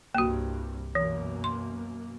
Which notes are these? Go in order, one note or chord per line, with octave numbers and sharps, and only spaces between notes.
C2 G2 A#3 F#4
F#2 B2 E3 A#3
C6